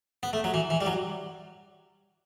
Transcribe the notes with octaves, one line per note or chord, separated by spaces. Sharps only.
B3
A3
F#3
E3
E3
G3
F#3